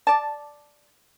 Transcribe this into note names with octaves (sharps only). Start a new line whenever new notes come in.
D5 A5